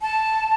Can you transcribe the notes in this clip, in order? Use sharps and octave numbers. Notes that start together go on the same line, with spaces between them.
A5